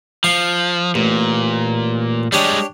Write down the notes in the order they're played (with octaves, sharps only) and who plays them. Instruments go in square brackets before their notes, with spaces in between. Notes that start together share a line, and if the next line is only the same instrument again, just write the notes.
[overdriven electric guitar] F3 [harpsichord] F5
[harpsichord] A1 [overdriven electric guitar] A#2
[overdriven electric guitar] G3 G#3 [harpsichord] D4 G4 C#5